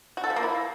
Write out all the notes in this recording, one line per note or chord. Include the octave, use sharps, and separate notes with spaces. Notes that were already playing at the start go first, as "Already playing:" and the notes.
F#4
A4
F3
A#3
E4